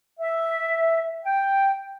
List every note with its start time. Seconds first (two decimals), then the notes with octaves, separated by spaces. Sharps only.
0.19 E5
1.24 G5